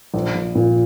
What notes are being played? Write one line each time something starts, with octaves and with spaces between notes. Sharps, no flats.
A#1
A#1
A#2